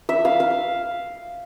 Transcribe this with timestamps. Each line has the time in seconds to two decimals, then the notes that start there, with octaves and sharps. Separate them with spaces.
0.09 E5
0.25 F5
0.40 F5